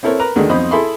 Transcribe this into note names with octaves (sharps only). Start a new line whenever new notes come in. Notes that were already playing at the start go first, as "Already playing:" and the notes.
C4 E4 A4 A#4 C#5
A#4 B4 A#5
D2 D3 D#3 G#3 D4
B1 F2 D#4 C5 B5 D#6
E4 G#4 A4 E5 B5 C6